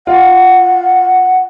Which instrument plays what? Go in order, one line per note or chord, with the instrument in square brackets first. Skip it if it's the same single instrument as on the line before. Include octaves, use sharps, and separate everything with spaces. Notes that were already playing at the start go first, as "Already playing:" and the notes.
[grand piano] F4 [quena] F#5